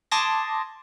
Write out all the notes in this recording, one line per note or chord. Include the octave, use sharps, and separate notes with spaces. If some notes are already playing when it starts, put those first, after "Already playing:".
A5 C6 D6 D#6 G#6 A#6